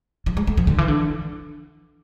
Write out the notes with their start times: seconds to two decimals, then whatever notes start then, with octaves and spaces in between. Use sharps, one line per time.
0.26 F3
0.37 G#3
0.47 A3
0.57 F3
0.67 D3
0.78 E3
0.88 D3